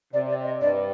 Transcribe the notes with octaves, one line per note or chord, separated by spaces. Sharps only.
C3 D5
D5
D#5
G2 D5